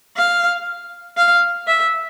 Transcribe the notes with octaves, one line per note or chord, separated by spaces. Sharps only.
F5
F5
E5